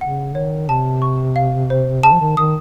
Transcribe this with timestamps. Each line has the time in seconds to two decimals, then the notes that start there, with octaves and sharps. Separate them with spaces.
0.01 C#3 F#5
0.35 D#3 C#5
0.69 C3 A5
1.02 C#6
1.36 F5
1.70 C5
2.03 C#3 A5
2.13 F3
2.20 D#3
2.37 D#3 D#6